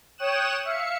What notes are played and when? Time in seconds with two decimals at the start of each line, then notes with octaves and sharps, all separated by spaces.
0.18 C#5 G5 D#6 F#6 E7
0.65 E5 F5 C#7